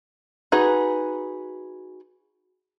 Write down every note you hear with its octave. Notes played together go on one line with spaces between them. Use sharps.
D#4 F#4 G#4 B4